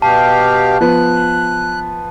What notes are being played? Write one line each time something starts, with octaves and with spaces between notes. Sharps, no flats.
B2 G4 F5 A5
F3 B3 B4 F#6